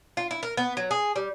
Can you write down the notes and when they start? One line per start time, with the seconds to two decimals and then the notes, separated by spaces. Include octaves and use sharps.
0.17 F4
0.31 E4
0.43 A#4
0.57 B3
0.77 F#3
0.91 G#4
1.16 G3